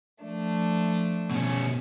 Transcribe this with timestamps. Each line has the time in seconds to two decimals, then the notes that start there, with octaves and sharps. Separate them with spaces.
0.22 F3 A3 D4
1.31 B2 C#4